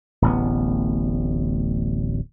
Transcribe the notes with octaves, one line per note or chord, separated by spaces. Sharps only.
D1 A1 B3